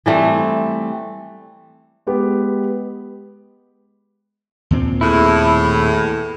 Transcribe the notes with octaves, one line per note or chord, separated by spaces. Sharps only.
E3 G3 A3 C4
G#3 B3 G4
D#2 A#2 C4
E2 A2 E4